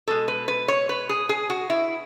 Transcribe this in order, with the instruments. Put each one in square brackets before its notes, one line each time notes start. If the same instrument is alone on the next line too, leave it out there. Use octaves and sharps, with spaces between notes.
[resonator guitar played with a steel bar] B2 G#3 A4
B4
B4
C#5
B4
G#4
G#4
F#4
E4